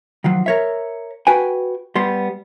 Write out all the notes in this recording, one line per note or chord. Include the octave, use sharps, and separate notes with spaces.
D#3 F3 F#3
A#4 C#5 E5
F#4 B4 G5 G#5
G3 B3 C6